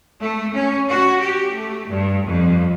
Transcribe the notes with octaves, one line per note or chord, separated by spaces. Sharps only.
A3
C#4
F#4
G4
A3
G2
F2